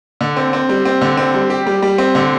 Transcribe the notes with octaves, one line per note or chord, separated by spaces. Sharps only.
D3
C4
C4
G3
C4
D3
C4
G3
G4
G3
G3
C4
D3